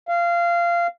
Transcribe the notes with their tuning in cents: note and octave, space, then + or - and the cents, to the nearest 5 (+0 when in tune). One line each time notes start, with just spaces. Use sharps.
F5 -20